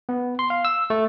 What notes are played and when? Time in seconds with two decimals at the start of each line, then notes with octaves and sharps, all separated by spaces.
0.09 B3
0.39 C6
0.50 F5
0.65 E6
0.90 A3